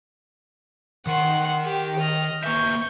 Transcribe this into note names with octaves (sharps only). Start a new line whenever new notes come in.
D#3 A#4 F#5 C6
G4
D#5 F6
A#3 B4 E5 C#6 G6